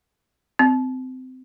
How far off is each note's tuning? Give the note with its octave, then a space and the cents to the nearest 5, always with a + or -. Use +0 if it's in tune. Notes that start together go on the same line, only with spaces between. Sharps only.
C4 -25